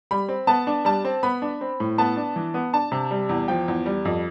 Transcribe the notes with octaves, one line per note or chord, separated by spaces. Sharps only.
G3 B5
C4
B3 A5
D4
G3 A5
C4
B3 B5
D4
C4
A2
B3 A5
D4
E3
B3
D4 A5
C3
G3
E2
F3 G5
E2
G3
F2